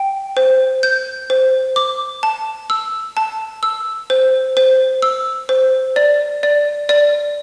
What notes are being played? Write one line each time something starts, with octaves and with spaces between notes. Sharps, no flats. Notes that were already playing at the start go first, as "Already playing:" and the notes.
Already playing: G5
C5
G6
C5
D6
A5
E6
A5
E6
C5
C5
E6
C5
D5
D5
D5